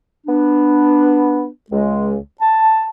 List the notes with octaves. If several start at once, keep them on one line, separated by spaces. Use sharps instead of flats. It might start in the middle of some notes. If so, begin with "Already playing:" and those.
B3 D4
C#2 G#3
A5